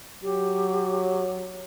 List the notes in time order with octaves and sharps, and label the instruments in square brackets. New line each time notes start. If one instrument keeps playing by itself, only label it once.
[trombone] F#3 [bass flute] G4